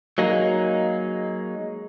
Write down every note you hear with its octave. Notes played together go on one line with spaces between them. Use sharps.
F#3 G#3 A#3 D#4